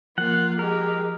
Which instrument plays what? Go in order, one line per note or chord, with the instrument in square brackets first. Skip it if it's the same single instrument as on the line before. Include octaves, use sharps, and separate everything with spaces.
[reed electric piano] F3 [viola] A#3 F4 [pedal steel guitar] F#5
[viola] G#3 G4 [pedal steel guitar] A#4